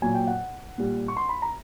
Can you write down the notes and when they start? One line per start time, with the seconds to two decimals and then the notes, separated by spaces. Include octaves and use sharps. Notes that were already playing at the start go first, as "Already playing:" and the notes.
0.02 A#2 F#3 G#5
0.15 G5
0.27 F#5
0.78 A#2 G3
1.08 C#6
1.17 C6
1.29 B5
1.42 A#5